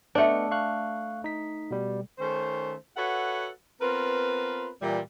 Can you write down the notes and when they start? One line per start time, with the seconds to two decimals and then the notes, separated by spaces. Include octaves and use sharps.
0.15 A3 B3 D4 D#5 C#7
0.51 F5 C#6 F#6
1.24 D#4 B6
1.71 B2 G3
2.19 D#3 A3 C#4 C5
2.97 F#4 A4 B4 C#5 E5 F#5
3.80 B3 C4 F4 A#4 B4
4.81 A#2 E3 G3